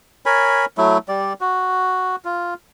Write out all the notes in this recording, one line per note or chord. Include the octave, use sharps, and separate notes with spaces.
A#4 C#5 G#5 B5
F#3 A3 E4
G3 D5
F#4
F4